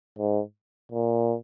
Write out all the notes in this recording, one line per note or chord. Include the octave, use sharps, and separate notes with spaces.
G#2
A#2